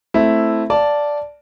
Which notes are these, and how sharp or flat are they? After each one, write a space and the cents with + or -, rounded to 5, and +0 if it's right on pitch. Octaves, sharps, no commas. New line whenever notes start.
A3 +0 C4 +0 E4 +0
D5 -5 F5 +0 A5 +0